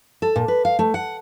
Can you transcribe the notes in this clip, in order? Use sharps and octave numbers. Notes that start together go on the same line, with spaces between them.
A4
A#2
B4
F5
A3
F#5